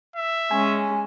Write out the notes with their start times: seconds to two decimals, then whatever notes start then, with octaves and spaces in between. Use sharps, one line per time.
0.16 E5
0.51 G#3 C#4 G#5